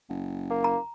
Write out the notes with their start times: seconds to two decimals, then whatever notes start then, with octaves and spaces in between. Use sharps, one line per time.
0.09 F#1
0.51 A#3
0.64 A#5